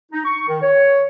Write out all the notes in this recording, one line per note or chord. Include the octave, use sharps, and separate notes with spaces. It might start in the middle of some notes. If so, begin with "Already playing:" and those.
D#4
C#6
D#3
C#5